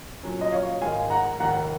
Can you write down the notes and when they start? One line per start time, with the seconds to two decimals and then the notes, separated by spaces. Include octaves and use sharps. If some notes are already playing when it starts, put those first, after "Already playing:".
0.23 A#2 F#3 C#4
0.41 D#5
0.52 C#5 F5
0.82 G#2 D#3 G#3 F5 G#5
1.10 F#5 A#5
1.40 F1 D#2 D#3 F#5 A#5